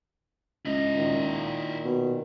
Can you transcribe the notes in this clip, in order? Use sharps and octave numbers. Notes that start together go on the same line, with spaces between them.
C#2 E4 D#5
A#2 D#3
B2